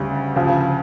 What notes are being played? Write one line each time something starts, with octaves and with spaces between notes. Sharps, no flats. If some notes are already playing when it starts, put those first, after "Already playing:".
Already playing: D2 C#3 G3
D2 C#3 F3